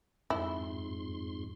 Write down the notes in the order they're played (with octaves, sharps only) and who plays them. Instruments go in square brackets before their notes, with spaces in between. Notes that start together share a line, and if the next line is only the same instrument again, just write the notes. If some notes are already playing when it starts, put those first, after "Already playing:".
[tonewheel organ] F2 G#2 C6 [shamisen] E4